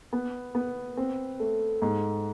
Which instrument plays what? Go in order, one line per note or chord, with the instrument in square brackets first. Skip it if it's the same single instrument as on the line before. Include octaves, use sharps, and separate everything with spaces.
[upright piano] B3
B3
C4
A3
G#2